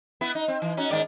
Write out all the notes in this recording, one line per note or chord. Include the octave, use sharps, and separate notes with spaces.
B3 E4 B4
D#4
C4
E3
C#4 D#4 F#4
G#2 D#3 D5